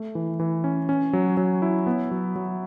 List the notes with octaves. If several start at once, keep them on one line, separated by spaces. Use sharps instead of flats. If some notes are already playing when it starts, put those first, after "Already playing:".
Already playing: A3
E3
E3
C#4
C#4
F#3
F#3
E4
B3
F#3
F#3